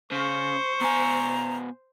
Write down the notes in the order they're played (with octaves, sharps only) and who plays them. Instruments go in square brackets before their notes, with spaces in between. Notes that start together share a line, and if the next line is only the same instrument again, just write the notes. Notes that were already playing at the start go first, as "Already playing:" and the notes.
[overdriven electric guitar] C#3 [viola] C5 [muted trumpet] C#6
[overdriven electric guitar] B2 G#5 [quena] A#5